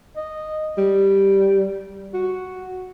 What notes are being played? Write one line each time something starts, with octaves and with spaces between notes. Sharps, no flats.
D#5
G3
F#4